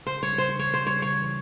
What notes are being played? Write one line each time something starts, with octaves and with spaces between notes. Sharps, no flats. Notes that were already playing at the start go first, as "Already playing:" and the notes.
C#3 C5
G3 C#5
C#3 C5
E3 C#5
C#3 C5
G3 C#5
C#3 C#5
E3